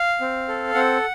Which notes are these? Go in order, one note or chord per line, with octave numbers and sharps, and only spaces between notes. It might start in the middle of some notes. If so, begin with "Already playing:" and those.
Already playing: F5
C4
A4
C4 F#5